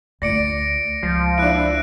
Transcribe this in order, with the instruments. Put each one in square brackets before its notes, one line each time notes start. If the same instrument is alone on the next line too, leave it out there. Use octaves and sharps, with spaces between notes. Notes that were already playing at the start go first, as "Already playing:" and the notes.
[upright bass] D2 F4 [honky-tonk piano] D5 [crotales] A#6 C#7 D7
[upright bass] C#2 [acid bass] F3
[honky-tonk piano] D4 E4 [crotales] F#6 D7